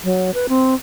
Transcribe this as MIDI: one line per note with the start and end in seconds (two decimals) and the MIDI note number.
0.04 0.31 54
0.34 0.47 71
0.49 0.75 60